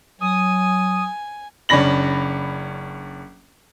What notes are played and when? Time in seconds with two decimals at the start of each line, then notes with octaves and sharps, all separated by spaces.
0.21 F#3 G#5 D#6
1.69 F#1 C#4 D4 B5 A#6 F#7